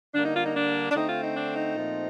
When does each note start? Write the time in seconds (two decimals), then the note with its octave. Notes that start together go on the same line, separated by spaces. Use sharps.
0.14 D3 G3 A#3 D4
0.24 D#4
0.34 F4
0.44 D#4
0.54 D4
0.90 D4
0.95 D3 A3 C4 D#4
1.09 F4
1.22 D#4
1.35 D4
1.55 D#4
1.75 A#2 F3 A3 C4